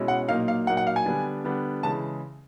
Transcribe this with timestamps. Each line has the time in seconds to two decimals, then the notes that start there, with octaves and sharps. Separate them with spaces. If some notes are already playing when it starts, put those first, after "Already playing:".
Already playing: B2 G#3 C#4 E4
0.08 F#5
0.28 A#2 F#3 A#3 D#4 F5
0.48 F5
0.67 A#2 F#3 A#3 D#4 F#5
0.77 F#5
0.87 F5
0.96 G#5
1.06 D3 G3 B3 D4
1.44 D3 G3 B3 D4
1.83 C#3 E3 G#3 A5